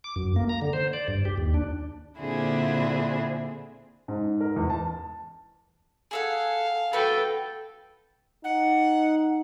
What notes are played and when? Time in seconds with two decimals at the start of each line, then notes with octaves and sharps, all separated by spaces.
0.04 D6
0.16 F#2
0.36 A#3
0.49 A#5
0.62 D3
0.73 C5
0.93 D5
1.08 G2
1.25 G4
1.37 D#2
1.54 D4
2.20 A#2 D3 C4 D4 E4 G#4
4.08 G#2
4.40 A#4
4.56 E2
4.70 A5
6.11 G#4 A4 F5 F#5
6.93 F#4 A4 B4 G5
8.44 D#4 F#5